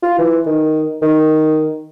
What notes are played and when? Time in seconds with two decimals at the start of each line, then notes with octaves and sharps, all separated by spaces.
0.03 F4
0.18 E3
0.46 D#3
1.02 D#3